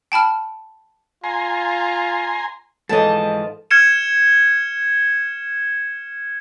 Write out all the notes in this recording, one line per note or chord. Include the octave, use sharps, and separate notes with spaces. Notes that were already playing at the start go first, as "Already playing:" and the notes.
G5 A5 B5 F6
F4 G#5 A#5 C6
G#2 E3 F3 A4 D#5 A5
F6 G#6 C#7 E7